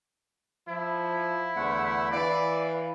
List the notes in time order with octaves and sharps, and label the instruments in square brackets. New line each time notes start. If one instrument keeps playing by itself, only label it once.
[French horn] F3 [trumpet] E4
[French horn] E2 [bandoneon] D3 A3 F#5
[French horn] E3 [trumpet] D5 [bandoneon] F5 B5